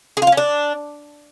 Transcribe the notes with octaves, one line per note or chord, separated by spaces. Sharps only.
G#4
F4
F5
C#4
D4